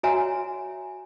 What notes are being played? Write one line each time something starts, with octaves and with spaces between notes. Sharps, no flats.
F#4 C#5 E5 G#5 A#5